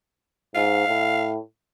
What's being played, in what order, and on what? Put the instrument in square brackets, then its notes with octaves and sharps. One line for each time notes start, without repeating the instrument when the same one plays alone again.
[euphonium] G#2 [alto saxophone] F5
[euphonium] A2